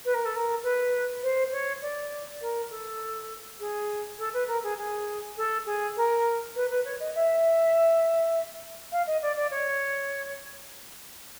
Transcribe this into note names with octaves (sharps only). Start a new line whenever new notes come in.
B4
A#4
A4
A#4
B4
C5
C#5
D5
A#4
A4
G#4
A4
B4
A#4
G#4
G#4
A4
G#4
A#4
B4
B4
C#5
D#5
E5
F5
D#5
D5
D5
C#5